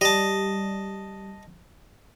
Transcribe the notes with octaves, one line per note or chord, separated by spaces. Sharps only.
G3 D#5 A5